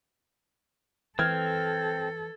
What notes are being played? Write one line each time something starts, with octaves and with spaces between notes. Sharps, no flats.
E3 C4 A4 F6 G#6